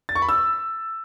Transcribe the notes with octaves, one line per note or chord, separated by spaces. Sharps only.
A6
C#6
B5
E6